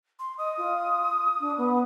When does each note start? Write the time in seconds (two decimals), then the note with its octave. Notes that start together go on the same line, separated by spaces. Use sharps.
0.19 C6
0.38 D#5 D#6
0.57 F4
1.40 D4
1.57 B3